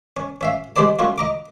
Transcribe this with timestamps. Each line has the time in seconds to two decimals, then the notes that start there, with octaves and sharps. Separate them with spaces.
0.17 C#4
0.41 C#4 E5 F5
0.76 G#3 D4 G4 C5 D5 A5
0.99 A3 C#4 F4 F#4
1.18 D#5 A#5 D6